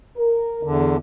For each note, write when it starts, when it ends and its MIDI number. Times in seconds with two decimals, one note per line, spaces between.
0.17 0.68 70
0.63 0.97 40
0.63 0.97 50